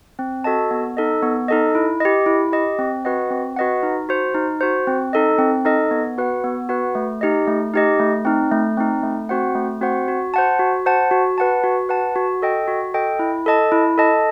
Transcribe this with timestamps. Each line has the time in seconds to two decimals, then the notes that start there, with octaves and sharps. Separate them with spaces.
0.19 C4
0.44 F#4 A4 D#5 A5
0.71 B3
0.97 D#4 A4 D#5
1.23 B3
1.48 D#4 A4 D#5
1.75 E4
2.00 G4 D#5
2.26 E4
2.52 G4 D#5
2.79 C4
3.05 F#4 B4 D#5 F#5
3.30 C4
3.56 F#4 B4 D#5 F#5
3.83 D#4
4.09 F#4 C5
4.34 D#4
4.61 F#4 C5
4.87 C4
5.13 D#4 A4 D#5
5.38 C4
5.65 D#4 A4 D#5
5.91 B3
6.18 F#4 B4 F#5
6.44 B3
6.69 F#4 B4 F#5
6.95 A3
7.21 D#4 G4 D#5
7.48 A3
7.74 D#4 G4 D#5
7.99 A3
8.25 C4 D#4
8.52 A3
8.77 C4 D#4
9.03 A3
9.29 C4 F#4 C5 F#5
9.55 A3
9.81 C4 F#4 C5 F#5
10.08 F#4
10.34 C5 F#5 A5
10.59 F#4
10.86 C5 F#5 A5
11.11 F#4
11.38 B4 F#5 A5
11.64 F#4
11.89 B4 F#5 A5
12.16 F#4
12.42 A4 D#5 G5
12.68 F#4
12.94 A4 D#5 G5
13.19 E4
13.46 A4 D#5 A5
13.72 E4
13.98 A4 D#5 A5